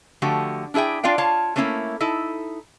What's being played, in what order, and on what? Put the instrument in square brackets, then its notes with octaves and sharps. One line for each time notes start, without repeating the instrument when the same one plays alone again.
[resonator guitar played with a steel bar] D3 F3 A3 F#4 G4
D4 E4 G#4 E5 G5
D4 F4 D5 F5 G5
F4 C#5 F5 A5
A3 A#3 C#4 D#4 E4
D#4 E4 A4